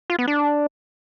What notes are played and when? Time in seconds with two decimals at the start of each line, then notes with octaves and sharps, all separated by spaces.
0.10 F4
0.19 B3
0.28 D4